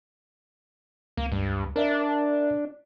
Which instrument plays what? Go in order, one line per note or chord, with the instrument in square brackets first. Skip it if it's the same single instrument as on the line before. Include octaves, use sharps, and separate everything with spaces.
[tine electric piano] C#2 [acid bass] A#3
[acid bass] G2
[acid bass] D4 [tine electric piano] A#4 D5 E5